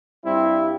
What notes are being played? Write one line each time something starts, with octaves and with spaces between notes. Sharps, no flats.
G2 G3 C4 E4